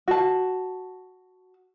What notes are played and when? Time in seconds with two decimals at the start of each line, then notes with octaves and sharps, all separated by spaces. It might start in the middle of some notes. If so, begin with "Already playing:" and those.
0.08 F#4 A5